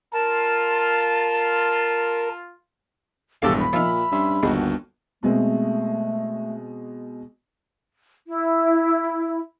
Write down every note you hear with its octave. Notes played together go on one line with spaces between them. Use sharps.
F4 A#4 A5
E1 A#1 G2 G4 A4 D5 F5
B5
A#2 F3 D#4 E5 E6 F6
G2 C#4 E5 C6
G1 D#2 G#3 F#4
B2 G#3 A3 C4
E4